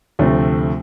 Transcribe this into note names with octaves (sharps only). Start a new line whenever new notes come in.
D2 C3 F3 A3 C4